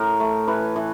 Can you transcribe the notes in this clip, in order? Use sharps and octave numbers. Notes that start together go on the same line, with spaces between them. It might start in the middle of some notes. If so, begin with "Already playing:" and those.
Already playing: A2 A#4
A3
E3 B4
E3